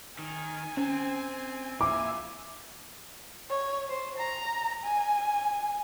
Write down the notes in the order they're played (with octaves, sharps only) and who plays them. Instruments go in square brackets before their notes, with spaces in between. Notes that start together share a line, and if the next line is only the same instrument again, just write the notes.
[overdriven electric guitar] D#3 [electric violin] G#5
[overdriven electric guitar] C4 [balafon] C#4
[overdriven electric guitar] A#2 [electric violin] E5 G#5 [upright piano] D6
[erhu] C#5
C5
A#5
G#5